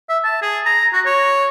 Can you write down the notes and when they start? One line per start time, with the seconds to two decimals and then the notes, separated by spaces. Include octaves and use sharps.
0.09 E5
0.24 A5
0.42 G#4
0.66 A#5
0.93 F#4
1.05 C#5